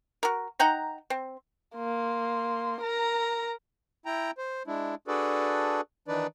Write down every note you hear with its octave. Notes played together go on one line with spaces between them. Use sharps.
F#4 A#4
D#4 F#5 G5 A#5
C4
A#3 C6
A#4 A#5
E4 G5 A#5
C5
G#3 D4 E4
D4 F#4 G#4 A4 B4 D5
D#3 E3 D4 D#4 B4 D5